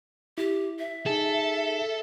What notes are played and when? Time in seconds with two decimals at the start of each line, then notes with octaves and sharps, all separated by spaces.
0.38 E4 G4
0.79 E5
1.06 D#4 G#4 A4